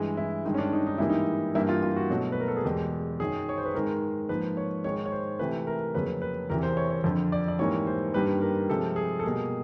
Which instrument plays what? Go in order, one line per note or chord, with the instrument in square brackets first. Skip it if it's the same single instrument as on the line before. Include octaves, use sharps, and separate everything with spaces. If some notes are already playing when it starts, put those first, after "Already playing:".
Already playing: [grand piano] G2 E3 G#3
E4
G2 D#3 G#3
C#4
D4
D#4
D#4
G#2 E3 G3 A#3 E4
D#4
G2 E3 G3 A#3 E4
F4
F4
F#4
B2 F#3 A3
B4
A#4
A4
G#4
E2 B2 G#3 G4
F#2 D#3 F#3 G#4
C#5
C5
B4
G#2 D#3 G#3 A#4
G#2 F3 A#3 B4
C#5
G#2 D#3 G#3 C#5
C#5
C5
C3 E3 A3 B4
A#4
F2 C#3 F#3 A#3 B4
B4
E2 C3 E3 A#4
C5
C#5
C#5
F2 D3 F3
D5
D5
G#2 E3 G3 A#3 C#5
C5
G2 D#3 G3 A#3 B4
A#4
C3 F3 G#3 A4
G#4
A4
B2 G3 A#3 G#4